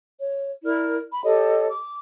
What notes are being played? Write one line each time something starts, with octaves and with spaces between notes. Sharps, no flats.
C#5
E4 A#4 D5 F6
B5
G4 A4 C#5 D#5
D6